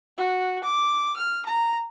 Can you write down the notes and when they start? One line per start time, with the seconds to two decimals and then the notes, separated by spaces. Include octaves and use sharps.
0.17 F#4
0.64 D6
1.16 F6
1.46 A#5